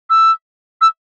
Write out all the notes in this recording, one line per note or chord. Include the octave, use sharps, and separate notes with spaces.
E6
E6